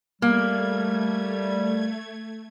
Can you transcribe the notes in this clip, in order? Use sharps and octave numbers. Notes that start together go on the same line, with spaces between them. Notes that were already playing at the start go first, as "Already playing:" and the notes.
G3 A3 A#3 G#6